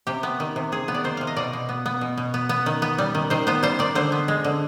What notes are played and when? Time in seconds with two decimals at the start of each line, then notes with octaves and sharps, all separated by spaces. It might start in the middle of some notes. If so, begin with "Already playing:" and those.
0.07 C3 G4
0.23 B3
0.40 D#3
0.56 C3
0.72 C3 G#4
0.88 B3
0.94 D5
1.04 D#3 C5
1.17 C3 F5
1.27 D#5
1.36 B2 D5
1.53 B2
1.69 B3
1.86 B3
2.01 B2
2.17 B2
2.34 B3
2.49 B3
2.66 D#3
2.82 B3
2.98 G3
3.15 D#3
3.30 D#3 C5
3.47 B3 C5
3.63 G3 C5
3.79 D#3 D5
3.95 D3 C5
4.12 B3
4.28 G#3
4.44 D3